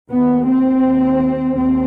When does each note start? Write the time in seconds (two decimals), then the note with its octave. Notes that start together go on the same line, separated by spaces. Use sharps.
0.11 D#2 B3
0.47 C4
0.83 D#2
1.55 D#2 C4